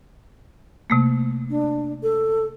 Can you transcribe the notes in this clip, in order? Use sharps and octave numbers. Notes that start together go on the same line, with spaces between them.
C3 A3 A#3
D4
A4